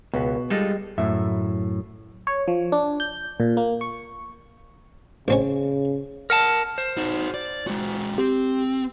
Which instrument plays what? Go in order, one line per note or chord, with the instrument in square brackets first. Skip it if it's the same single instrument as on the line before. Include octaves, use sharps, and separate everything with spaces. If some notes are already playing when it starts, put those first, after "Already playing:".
[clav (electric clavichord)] C#2 [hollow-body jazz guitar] B2 B3
[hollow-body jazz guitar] G3 G#3 [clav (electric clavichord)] D#4 F4 A4
[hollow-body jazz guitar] F#2 A2 E5
[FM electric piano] C#5
F3
D4
G6
A#2
A#3
C#6
[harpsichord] A1 C4 C#4 [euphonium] C#3
[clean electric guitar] A#4 F#5 A5 [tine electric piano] F6
[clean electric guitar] C5
[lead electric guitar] D#4 F#4
D5
G#3 F#4
[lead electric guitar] C4 [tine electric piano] G4